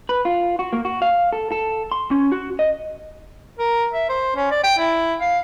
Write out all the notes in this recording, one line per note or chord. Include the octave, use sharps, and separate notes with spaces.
B4
F4
F#4
A#3
F#4
F5
A4
A4
C6
C#4
F#4
D#5
A#4
E5
C5
C#4
D5
G5
E4
F5